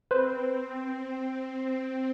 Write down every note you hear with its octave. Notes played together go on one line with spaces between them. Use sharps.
C4 B4 C5